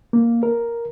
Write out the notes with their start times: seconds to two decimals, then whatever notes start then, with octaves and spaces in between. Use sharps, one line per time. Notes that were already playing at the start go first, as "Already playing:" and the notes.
0.13 A#3
0.43 A#4